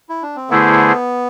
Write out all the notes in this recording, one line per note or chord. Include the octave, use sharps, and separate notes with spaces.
E4
D4
C4
D3 A3 B3 E4 G#4 C5